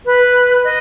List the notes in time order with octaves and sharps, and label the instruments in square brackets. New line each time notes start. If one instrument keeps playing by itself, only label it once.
[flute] B4
D#5